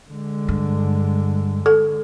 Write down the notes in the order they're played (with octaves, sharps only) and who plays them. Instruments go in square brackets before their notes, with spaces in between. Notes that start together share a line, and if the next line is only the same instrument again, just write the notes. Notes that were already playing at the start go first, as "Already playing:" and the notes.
[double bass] D3 G#3
[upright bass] G2
[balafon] A4